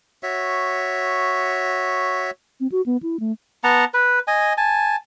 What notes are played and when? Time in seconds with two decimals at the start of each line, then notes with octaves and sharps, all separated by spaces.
0.23 F#4 C#5 E5
2.60 C4
2.72 F#4
2.86 B3
3.03 E4
3.20 A3
3.64 B3 F#5 A5 A#5
3.94 B4
4.27 D#5 G#5
4.57 G#5 A5